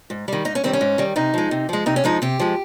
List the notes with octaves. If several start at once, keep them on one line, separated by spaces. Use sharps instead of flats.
G#2
D#3 G3
G#2 D#4
C#4
D#3 G3 C4
C#4
G#2
D#3 G3
C3 D#4
F3 G#3
C3
F3 G#3
C3 D#4
C#4
F3 G#3 D#4
C3 G4
F3 G#3